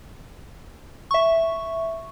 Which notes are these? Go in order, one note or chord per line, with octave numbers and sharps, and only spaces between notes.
E5 C#6